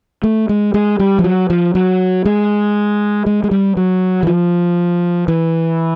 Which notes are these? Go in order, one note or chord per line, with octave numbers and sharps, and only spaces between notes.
A3
G#3
G#3
G3
F3
F#3
F3
F#3
G#3
G#3
G#3
G3
F#3
E3
F3
E3